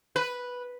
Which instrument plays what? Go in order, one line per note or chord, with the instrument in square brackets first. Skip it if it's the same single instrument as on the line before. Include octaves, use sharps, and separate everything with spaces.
[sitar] B4